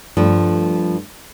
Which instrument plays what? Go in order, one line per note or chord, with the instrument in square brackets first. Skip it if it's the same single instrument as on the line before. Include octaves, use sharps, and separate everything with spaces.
[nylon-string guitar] G2 F3 A3